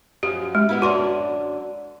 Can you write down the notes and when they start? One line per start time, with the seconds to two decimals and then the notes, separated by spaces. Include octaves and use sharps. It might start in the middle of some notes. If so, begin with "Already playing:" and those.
0.23 F#2 F3 G4
0.55 G#3
0.69 B2 B3 E4
0.82 F#2 D3 F#4 C6